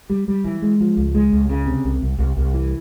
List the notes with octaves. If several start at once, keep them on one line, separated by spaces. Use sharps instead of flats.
G3
G3
E3
G#3
F3
C#2
G#3
C#2
C#3
C3
C2
C2
C2
C2
E3